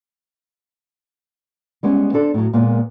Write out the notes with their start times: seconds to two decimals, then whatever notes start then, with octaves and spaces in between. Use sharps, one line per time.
1.83 G3 G#3 B3 C#4
2.13 C4 D4 A4
2.34 A2 F#3
2.53 A#2 G#3 A#3 B3